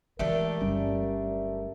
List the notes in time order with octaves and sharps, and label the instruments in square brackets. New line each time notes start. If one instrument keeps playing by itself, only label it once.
[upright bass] E3 G#3 [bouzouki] A3 D4 G4 [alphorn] A#4
[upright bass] G1 [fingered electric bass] F#3 G3 C#4